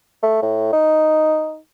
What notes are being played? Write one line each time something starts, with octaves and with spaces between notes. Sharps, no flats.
A3
A2
D#4